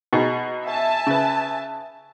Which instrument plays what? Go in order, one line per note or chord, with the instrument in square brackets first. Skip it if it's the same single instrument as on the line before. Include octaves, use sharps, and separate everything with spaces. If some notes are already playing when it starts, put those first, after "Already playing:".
[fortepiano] B2 D#4 G#4
[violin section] E5 G#5 A5
[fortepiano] C#3 B4